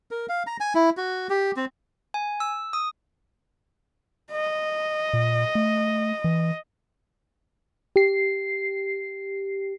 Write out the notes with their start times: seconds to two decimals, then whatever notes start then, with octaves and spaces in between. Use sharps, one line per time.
0.11 A#4
0.29 F5
0.47 A#5
0.60 G#5
0.75 E4
0.97 F#4
1.30 G4
1.57 C4
2.14 G#5
2.40 E6
2.73 D#6
4.32 D#5
5.13 A#2
5.55 A3
6.24 E3
7.96 G4 C7